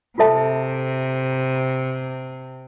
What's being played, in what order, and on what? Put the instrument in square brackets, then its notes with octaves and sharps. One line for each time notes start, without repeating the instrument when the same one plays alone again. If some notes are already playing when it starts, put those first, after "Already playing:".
[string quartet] C3 [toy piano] F4 A4 E5 A5